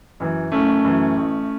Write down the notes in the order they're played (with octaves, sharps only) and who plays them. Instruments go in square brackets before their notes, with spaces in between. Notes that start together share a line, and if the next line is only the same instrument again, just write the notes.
[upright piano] F#2 E3
[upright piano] F#1 [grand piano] A3 C#4
[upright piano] F#2 E3
A1